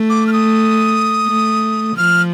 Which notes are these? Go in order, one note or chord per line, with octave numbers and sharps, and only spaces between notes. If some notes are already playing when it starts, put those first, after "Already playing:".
Already playing: A3
D6
F6
D#6
A3
F3 F6